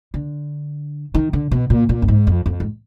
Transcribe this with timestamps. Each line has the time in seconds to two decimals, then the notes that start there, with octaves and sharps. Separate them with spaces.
0.14 D3
1.14 D#3
1.33 D3
1.52 B2
1.70 A#2
1.89 A#2
2.02 F#2
2.08 G#2
2.27 F2
2.46 F2
2.60 G#2